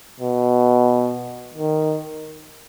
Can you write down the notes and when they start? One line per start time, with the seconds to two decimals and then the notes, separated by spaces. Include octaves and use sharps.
0.21 B2
1.54 D#3